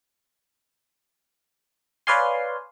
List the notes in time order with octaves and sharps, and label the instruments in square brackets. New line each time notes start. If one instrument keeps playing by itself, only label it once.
[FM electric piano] B4 C#5 D5 F5 G#5 C6